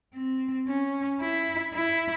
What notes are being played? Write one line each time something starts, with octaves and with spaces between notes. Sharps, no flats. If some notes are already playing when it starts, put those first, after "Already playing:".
C4
C#4
E4
E4